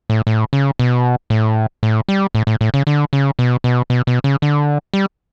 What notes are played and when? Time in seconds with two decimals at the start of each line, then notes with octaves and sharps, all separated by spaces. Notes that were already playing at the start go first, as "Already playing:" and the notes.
0.10 A2
0.27 A2
0.53 C#3
0.79 B2
1.30 A2
1.83 A2
2.09 G3
2.35 A2
2.47 A2
2.61 A2
2.74 C#3
2.87 D3
3.13 C#3
3.39 B2
3.64 B2
3.90 B2
4.07 B2
4.24 C#3
4.42 D3
4.94 G3